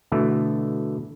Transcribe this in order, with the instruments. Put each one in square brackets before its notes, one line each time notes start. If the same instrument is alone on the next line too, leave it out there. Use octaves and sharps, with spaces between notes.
[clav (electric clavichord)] B2 D3 E3 A3